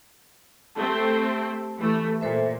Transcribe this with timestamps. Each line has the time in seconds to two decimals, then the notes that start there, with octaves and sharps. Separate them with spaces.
0.75 A3 C4 G4 A5
1.77 E3 A3
2.21 A#2 A4 C5 E5